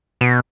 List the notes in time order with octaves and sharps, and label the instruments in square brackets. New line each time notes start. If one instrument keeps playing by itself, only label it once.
[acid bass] B2